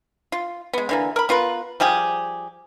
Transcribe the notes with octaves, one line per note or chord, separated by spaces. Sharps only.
F4
G#3 B3
D3 E3 A#3
A#4 B5
B3 F4 A#4 B4
F3 G3 G4 G#4